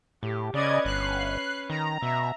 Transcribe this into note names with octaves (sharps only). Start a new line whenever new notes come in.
A2 G4
C#3 C#4 B4 D5 D#5 G#6
G1 F#6 C7
D#3 A#5
B2 E5